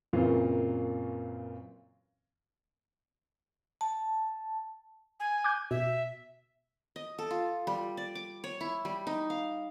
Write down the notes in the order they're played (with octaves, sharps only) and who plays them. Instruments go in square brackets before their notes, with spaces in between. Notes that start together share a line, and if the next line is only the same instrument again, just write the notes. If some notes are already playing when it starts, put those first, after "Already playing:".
[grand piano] F#2 A#2 C#3 E3 C4 F5
[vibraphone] A5
[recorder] G#5
[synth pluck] D6 F#6 G6
[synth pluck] B2 [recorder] E5
[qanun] D#5
A4
F4
G3
D5
D6
C#5
E4
G3
D#4
F5